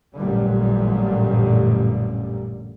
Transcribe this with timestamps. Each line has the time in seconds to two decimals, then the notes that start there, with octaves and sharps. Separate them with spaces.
0.15 A1 F#2 A#2 D3 G3